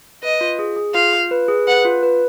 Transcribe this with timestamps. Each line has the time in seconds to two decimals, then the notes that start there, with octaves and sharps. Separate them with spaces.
0.23 B4 D#5
0.41 F4
0.59 G#4
0.76 G#4
0.94 F4 F5
1.13 F4
1.31 B4
1.48 G#4
1.68 B4 F#5
1.85 F4
2.03 B4